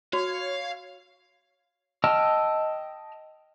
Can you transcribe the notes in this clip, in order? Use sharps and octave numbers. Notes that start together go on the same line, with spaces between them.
F#4 C#5 F5
D#5 G5 A5 E6 F6